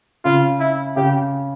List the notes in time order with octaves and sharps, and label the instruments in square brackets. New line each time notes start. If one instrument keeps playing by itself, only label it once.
[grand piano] C#3 [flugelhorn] F4
[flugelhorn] E4
[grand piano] C#3 [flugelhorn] G4